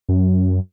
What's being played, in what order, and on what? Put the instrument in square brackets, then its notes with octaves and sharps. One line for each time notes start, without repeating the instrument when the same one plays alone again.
[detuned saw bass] F#2